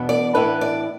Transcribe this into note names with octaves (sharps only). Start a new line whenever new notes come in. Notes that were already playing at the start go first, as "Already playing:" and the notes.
Already playing: E2 B2 B3 D4
D5
A2 E3 B3 D4 B4
D5